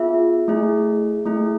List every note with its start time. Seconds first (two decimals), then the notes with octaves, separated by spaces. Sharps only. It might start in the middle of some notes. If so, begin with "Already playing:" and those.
Already playing: B3 F4 G#4 E5
0.48 A3 E4 G#4
1.26 A3 E4 G#4